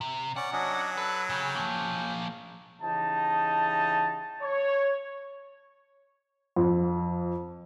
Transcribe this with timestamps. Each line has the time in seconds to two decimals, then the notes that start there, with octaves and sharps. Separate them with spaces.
0.01 C3
0.36 C#4 D5 F#5
0.53 F#3 C#4 D4 D#5
0.97 A4 B4
1.30 C#3 C#4 G5
1.55 F3 A#3
2.81 C#3 E3 D#4 G4 A5
4.42 C#5
6.56 F2